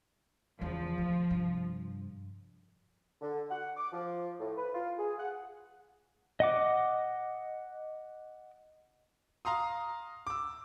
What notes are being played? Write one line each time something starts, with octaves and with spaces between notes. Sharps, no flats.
E2 C#3 F3
D2 D#3
G2 C3
D3
F#5
D6
F3
A2
B4
F4
G#4
F#5
D#5 F#5 D6
F5 A#5 C6 D#6
D6 E6